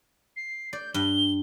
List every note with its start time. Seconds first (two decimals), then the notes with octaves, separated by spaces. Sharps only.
0.36 C7
0.73 D5 G6
0.94 G2 G7